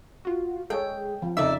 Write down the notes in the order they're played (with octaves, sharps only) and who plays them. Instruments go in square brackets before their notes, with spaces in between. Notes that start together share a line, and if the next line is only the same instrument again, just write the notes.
[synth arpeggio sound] F4 F#4
[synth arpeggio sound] G#3 G#4 [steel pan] A4 C#5 [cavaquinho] G5
[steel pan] F3
[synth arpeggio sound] F2 C#3 E7 [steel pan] D#4 A4 [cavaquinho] D5 E5